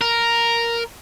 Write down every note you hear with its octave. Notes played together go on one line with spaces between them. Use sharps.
A#4